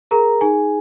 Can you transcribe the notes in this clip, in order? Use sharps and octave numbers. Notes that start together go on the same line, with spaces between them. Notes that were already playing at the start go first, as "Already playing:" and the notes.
G#4 A#4 A#5
D#4 G#4 G#5